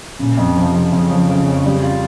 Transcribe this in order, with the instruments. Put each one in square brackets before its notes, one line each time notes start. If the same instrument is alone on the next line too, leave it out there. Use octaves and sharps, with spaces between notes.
[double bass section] A#2 [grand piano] C#3
[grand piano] F2
[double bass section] C3 [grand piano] F3
[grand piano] F2
[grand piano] F2 [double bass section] C#3
[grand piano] F3
F3
F2
G3
F4